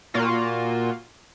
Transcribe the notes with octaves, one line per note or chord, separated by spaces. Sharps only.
A#2 A#3 F4 F#4